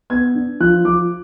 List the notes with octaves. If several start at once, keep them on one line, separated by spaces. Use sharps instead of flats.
B3 G#6
D4
F3 F#6
F3 D6